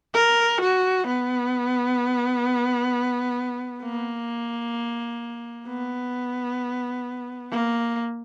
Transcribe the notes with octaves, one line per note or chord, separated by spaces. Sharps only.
A#4
F#4
B3
A#3
B3
A#3